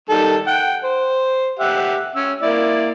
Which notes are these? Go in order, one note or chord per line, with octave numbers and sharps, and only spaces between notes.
D#3 G3 A4
F#5 G5
C5
G4 E5 F#5
C#4 E6
A#3 E4 D5